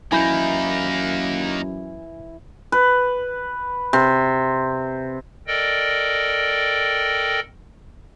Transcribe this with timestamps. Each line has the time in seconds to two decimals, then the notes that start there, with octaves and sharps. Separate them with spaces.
0.12 F#2 E3 A#3 D#4 E4 G#5 B5 G6
2.72 B4
3.93 C3
5.47 A4 A#4 D5 D#5 G5